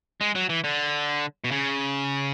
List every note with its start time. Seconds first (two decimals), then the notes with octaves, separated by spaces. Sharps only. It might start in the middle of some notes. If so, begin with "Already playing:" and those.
0.21 G#3
0.35 F#3
0.49 E3
0.64 D3
1.44 B2
1.51 C#3